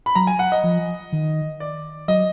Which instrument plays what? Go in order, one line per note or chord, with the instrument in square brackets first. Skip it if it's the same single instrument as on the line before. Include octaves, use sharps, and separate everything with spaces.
[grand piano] B5
[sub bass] F#3 [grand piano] A#5
[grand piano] G#5
F#5
D#5
[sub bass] F3
D#3
[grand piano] D5
[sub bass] F#3 [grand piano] D#5